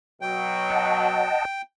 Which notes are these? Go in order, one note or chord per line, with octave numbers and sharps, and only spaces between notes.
B2 F#3 G5
D#5 F#5 A5